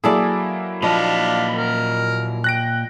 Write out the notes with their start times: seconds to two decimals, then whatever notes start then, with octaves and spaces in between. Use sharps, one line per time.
0.04 F#3 A#3 E4 G#4 A4 D5
0.83 A#2 F3 D4 D#5 F5 B5
1.56 A#4
2.44 G5 F#6 A#6 D7